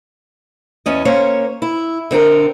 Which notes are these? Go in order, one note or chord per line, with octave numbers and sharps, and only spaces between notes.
E2 C#4 D#5
A#3 C#4 C5 C#5
E4
D3 C4 D4 A#4